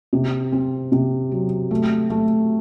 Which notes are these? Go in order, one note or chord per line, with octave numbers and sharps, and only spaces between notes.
C3
C4
C3
F#3
A3
A3